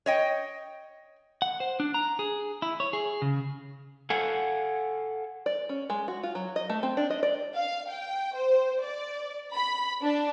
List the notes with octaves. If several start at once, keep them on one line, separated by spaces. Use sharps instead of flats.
C#5 D#5 G5
F#5
C5
D4
A#5
G#4
E4
C#5
G#4
C#3
A4 F5 F#5 G#5
D5
C#4
G#3
F#4
F4
F#3
D#5
A3
C4
D4
D#5
D5
F5
G5
C5
D5
B5
D4